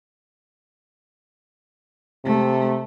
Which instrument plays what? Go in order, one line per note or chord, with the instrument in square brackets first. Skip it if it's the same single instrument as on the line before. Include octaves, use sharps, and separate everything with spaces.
[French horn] C3 [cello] A3